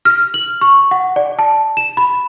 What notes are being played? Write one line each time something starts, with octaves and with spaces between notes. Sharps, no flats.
F6
F#7
C#6
F#5
D5
A5
E7
B5